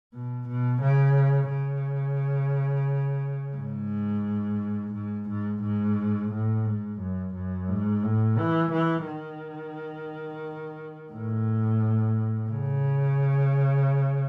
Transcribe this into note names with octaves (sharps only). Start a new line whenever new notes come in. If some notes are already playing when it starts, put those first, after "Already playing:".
B2
B2
C#3
C#3
G#2
G#2
G#2
G#2
A2
G#2
F#2
F#2
G#2
A2
E3
E3
D#3
A2
C#3